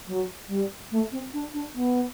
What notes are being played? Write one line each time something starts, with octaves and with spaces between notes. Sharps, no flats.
F#3
G3
A3
C4
D4
D4
B3